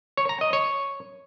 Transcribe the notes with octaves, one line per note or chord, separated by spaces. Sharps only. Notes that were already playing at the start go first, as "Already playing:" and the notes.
C#5
A#5
D#5
C#5